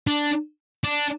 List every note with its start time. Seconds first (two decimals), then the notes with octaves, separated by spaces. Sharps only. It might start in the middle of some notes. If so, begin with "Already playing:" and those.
0.07 D4
0.84 D4